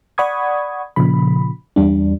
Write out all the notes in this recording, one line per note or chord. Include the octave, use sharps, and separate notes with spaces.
D5 F#5 B5 C#6 D#6 G#6
A#2 C#3 F3 B5
E2 G3 D4